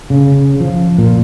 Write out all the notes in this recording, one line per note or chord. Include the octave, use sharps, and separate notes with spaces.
C#3
F3
A#2